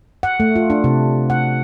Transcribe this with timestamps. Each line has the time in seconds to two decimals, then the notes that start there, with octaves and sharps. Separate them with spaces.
0.23 F#5
0.40 A3
0.56 F4
0.70 D4
0.84 C3
1.30 F#5